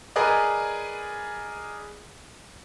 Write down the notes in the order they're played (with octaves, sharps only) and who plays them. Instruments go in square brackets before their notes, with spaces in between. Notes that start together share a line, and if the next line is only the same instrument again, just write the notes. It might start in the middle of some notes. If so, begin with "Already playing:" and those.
[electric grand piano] G#4 A#4 B4 D5 D#5